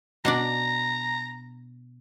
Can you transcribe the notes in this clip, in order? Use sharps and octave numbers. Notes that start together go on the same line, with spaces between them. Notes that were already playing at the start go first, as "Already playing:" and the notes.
B2 D4 D5 A#5